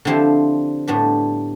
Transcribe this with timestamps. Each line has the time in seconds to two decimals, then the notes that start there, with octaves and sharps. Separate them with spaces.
0.05 D3 F3 C4 E4 G4
0.88 A2 G3 B3 D4